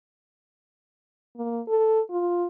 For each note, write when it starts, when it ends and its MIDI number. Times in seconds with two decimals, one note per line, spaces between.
1.37 1.61 58
1.68 2.00 69
2.11 2.47 65